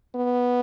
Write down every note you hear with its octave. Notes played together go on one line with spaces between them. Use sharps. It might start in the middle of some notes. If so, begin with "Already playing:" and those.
B3